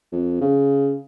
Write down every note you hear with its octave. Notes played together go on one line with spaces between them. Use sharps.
F2
C#3